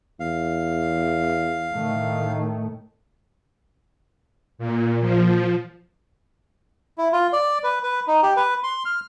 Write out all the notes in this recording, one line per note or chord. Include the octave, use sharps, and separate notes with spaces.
E2 F5
A2 D#3 A3
A#2
F3
E4
F4
D5
B4
B4
D#4
G4
B4
C6
F6